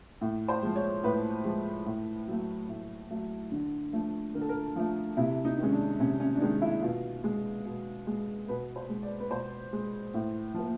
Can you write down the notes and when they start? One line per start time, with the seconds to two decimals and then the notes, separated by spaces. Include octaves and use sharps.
0.21 A2
0.48 C5
0.63 F3 G#3
0.76 C#5
1.03 A2 B4
1.44 F3 G#3
1.86 A2
2.27 F#3 A3
2.69 A2
3.10 F#3 A3
3.52 D3
3.93 F3 A3
4.35 D3 A#4
4.41 A4
4.49 A#4
4.76 F3 A3 F4
5.17 C3 E4
5.45 D#4
5.58 D#3 G#3 C#4
5.72 D4
6.00 C3 C#4
6.20 C#4
6.36 D4
6.41 D#3 G#3 D#4
6.62 E4
6.82 B2 F4
7.24 G#3
7.66 B2
8.07 G#3
8.48 B2 B4
8.76 C5
8.89 G#3
9.03 D5
9.20 B4
9.30 B2 C5
9.73 G#3
10.14 A2
10.54 F3 A#3